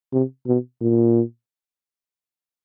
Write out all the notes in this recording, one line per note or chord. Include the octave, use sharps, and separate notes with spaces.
C3
B2
A#2